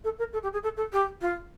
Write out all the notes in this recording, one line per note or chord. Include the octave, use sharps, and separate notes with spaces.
A4
A#4
A4
G4
G#4
A4
A4
G4
F4